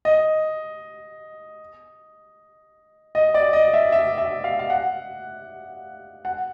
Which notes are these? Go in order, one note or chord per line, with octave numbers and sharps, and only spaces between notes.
D#5
D#5
D5
D#5
E5
E5
E5
F5
F5
F#5
F#5